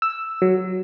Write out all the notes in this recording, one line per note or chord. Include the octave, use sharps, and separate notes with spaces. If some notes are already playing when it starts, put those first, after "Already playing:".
E6
F#3